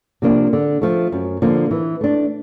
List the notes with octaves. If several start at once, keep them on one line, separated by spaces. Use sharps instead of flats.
C3 F3 A#3 D4
D3
F3 A3
F#2
D3 F3 A#3
E3
A3 D4